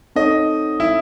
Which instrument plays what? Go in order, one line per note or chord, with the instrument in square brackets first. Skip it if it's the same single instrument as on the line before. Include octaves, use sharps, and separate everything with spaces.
[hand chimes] C4 D#4 A4 C#5 [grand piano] D#5
[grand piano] E4